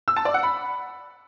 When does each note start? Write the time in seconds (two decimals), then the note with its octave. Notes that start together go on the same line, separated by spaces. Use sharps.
0.08 E6
0.16 A5
0.25 D5
0.34 F#5
0.43 B5